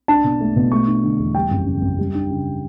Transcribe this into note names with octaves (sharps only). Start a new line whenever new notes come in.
D4 A5
B2
A3
B2
A3 C#6
D4
D3
E2
G3 G5
F#2
C#3
F#2
G3
D4
C#3